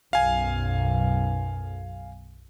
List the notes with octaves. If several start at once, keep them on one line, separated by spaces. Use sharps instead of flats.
B1 F#2 F5 G#5